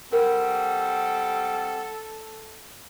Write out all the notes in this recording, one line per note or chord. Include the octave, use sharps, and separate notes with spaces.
G3 C4 A4 A#4 F#5